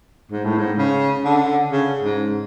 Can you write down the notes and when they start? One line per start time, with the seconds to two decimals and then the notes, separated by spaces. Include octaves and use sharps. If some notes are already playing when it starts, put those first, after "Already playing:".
0.32 G#2
0.45 A2
0.58 G#2
0.78 C#3
1.25 D3
1.72 C#3
2.02 G#2